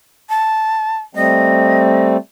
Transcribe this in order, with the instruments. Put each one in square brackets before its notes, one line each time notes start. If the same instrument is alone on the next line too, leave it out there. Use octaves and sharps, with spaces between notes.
[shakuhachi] A5
[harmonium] G3 A3 C4 [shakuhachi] D#5